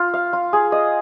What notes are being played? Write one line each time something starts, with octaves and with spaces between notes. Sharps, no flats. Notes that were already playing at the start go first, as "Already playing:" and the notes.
Already playing: F4
F5
F4
G#4
D#5